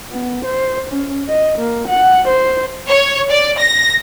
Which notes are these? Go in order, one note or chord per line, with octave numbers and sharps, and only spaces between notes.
B3
C5
C#4
D#5
A#3
F#5
C5
C#5
D5
A#6